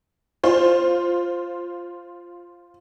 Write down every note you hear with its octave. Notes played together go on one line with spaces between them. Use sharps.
F4 C5